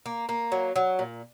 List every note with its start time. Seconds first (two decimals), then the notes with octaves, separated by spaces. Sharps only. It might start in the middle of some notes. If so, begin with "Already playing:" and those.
0.06 A#3
0.29 A#3
0.52 F#3
0.76 F#3
0.99 A#2